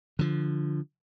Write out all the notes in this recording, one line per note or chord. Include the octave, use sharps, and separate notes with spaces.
D3 F3